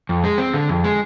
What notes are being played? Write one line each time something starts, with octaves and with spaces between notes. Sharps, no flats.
F2
G#3
C4
D3
F2
G#3